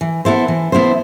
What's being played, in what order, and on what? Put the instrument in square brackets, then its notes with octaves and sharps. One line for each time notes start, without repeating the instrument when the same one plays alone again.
[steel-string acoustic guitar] E3
B3 E4 A4 C5
E3
B3 E4 A4 C5